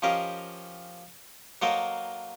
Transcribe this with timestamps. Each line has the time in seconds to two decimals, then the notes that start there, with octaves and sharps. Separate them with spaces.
0.02 F3 C#4 G4 A#4 D#5 F5
1.62 F#3 A#3 A4 A#4 C5 D#5